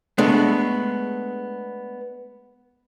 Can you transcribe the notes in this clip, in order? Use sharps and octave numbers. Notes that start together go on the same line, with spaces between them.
G#3 A3 B3 D4